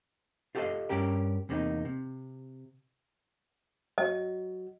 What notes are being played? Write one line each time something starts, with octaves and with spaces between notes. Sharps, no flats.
F4 G4 A4 C#5 D#5 F5
G2 C#4 G4 A#4
E2 C3 A#3 C4 D#4
C3
F#3 F#4 D#5